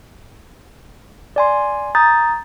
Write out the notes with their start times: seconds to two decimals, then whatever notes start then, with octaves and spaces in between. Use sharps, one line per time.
1.36 D5 G#5 C6
1.95 A#5 D#6 G6 A6